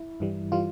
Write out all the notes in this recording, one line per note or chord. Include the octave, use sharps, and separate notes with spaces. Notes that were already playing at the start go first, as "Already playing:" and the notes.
Already playing: E4
G2 E3 G3
E3 G3 F4